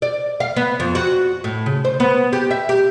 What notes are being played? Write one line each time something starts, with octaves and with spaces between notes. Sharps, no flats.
D5
F5
B3
F2
F#4
A2
C#3
C5
B3
G4
E5
G4